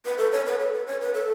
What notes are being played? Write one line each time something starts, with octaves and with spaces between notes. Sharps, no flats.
B4
A4
C#5
B4
A4
B4
C#5
B4
A4